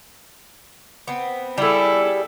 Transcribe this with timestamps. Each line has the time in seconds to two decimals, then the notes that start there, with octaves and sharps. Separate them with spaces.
1.07 B3 C4
1.58 G3 E4 G#4 A4